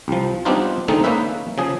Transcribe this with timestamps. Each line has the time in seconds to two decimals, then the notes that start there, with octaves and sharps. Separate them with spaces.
0.08 C2 F3
0.45 G3 B3 C4 D4 D#4 F4
0.88 D3 D#3 G#3 A3 C4 D#4
1.04 A#3 C#4 D#4 B4 E5
1.58 C#3 F3 G#4